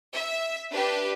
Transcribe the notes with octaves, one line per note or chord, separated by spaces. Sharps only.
E5
D4 G4 B4